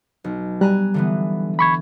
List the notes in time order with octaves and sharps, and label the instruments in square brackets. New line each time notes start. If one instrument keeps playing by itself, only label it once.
[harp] B1
[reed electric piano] G3 [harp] G#5 A#5 F#6
[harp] D3 E3 B3
[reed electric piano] B5 C#6 G#6